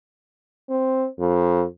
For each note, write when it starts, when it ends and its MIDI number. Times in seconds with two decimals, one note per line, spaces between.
0.70 1.07 60
1.19 1.65 41